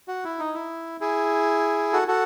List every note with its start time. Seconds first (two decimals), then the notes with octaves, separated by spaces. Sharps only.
0.08 F#4
0.25 E4
0.39 D#4
0.54 E4
1.01 E4 G#4
1.93 F#4 A4
2.08 F#4 A4